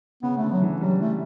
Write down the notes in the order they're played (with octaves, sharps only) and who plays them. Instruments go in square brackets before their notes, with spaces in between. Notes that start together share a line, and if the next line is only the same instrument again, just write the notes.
[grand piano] C#3 [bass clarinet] B3
[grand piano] D3 [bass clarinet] A3
[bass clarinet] F#3
[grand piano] E3
[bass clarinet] F#3 [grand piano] G3
[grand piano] E3 [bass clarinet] A3